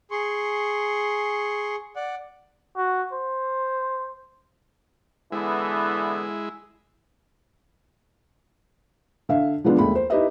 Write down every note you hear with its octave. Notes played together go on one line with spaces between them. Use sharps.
G#4 C6 C#6
D5 F#5
F#4
C5
D3 E3 G#3 B3 E4
D3 E5 F5
D3 F3 G#3 B3 D4 F4
D#2 G#3 A3 B5
C5
D#4 E4 G4 B4 D#5 E5